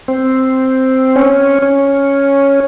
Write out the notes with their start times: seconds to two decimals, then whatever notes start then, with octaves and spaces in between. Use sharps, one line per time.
0.08 C4
1.16 C#4
1.62 C#4